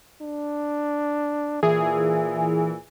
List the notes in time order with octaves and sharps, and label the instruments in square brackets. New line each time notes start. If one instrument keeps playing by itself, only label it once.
[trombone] D4
[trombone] A#2 [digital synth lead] E3 [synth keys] G#4